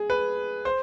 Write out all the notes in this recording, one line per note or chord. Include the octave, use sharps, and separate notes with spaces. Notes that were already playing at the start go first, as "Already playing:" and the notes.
Already playing: G#4
B4
C5